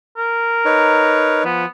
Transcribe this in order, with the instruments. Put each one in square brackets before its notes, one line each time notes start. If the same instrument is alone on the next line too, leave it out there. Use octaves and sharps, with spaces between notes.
[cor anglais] A#4
[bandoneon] D#4 B4 C#5
[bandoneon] F3 [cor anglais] B3